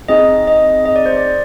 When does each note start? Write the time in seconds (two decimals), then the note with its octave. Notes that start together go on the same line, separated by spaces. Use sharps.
0.08 C4 D#4 G#4 D#5
0.47 D#5
0.85 D#5
0.96 D5
1.06 C5
1.16 D5